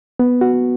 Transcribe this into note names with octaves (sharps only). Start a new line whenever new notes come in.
B3
F#4